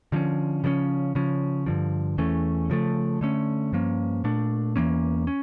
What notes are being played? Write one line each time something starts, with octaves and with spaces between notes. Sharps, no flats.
D3 F3 A3 C#4
C#3 F3 A#3 C#4
C#3 F3 C#4
G2 D3 F3
E2 E3 A3 C#4
C#3 F3 A3
D3 A3 C#4
G2 F3 A#3 C#4
A#2 A3 D4
E2 E3 A#3 C#4
C#4